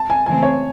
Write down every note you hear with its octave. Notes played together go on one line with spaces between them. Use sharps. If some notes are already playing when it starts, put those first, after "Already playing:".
Already playing: A5
G#5
C#3 E3 A3 C4 G#5
C#5